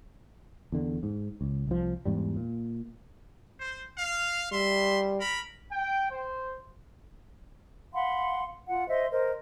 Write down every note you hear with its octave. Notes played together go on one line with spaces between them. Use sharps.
E2 D3
G#2
C#2
C2 F3
E2 G#2 G3
A#2
C5
F5
G3 E5 C6
A#4 B5
G5
C5
F5 F#5 B5 C6
F4 F#5
C5 D#5 E5 C6
A#4 C5 D#5